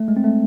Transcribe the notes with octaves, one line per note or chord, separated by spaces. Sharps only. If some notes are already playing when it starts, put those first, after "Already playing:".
Already playing: A3
G#3
C4
A3